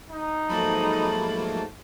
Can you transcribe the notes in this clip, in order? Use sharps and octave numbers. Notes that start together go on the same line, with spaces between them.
D#4
G#2 F3 F#3 A3 A#3 A5 B5